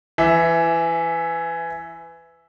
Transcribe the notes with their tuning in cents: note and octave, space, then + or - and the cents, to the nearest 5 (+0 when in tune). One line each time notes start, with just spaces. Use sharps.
E3 +20 E5 +0